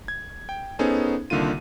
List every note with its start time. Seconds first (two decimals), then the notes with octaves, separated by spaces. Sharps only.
0.08 G#6
0.49 G5
0.79 B3 C#4 D#4 G#4 A4 C5
1.30 C2 D3 D#3 A#3 F4 D#7